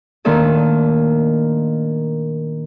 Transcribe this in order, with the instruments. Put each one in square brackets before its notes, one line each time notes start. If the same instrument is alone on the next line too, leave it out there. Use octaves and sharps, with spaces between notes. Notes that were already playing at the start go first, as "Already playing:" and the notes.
[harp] A#2 D#3 A3 D4 A4 D#5